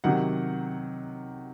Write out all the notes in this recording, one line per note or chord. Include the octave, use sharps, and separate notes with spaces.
C3 D#3 F#3 F#5